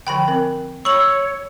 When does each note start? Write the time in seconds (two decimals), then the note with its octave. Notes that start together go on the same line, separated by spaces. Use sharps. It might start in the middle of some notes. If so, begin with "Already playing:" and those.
0.07 D3 F3 G5 B5 F#7
0.28 C4 A#4
0.85 C#5 B5 C#6 E6 F#7